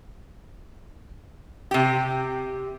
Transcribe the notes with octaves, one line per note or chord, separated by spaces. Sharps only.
C3 G4